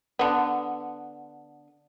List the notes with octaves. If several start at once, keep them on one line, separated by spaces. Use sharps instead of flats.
D3 B3